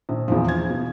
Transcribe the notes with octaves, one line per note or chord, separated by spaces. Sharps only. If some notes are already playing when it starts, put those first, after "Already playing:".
A#1
E2 E3 F3
G#6
B2